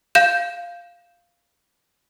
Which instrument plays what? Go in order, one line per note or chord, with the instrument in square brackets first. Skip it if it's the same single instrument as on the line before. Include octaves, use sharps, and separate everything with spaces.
[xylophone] F5 G6 E7